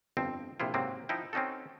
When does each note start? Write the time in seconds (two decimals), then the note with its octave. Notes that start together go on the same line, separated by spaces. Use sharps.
0.17 G1 F2 C4
0.60 A#1 C3 E4 F4
0.74 G#2 C3 F#3 A#3 C4
1.09 F3 D#4 E4 G5
1.33 C4 C#4 D#4 F#4 A4